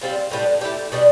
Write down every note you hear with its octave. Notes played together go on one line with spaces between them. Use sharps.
G3 C4 F4
A2 G3 B3 D4
A3 E4 G4
B2 G3 D4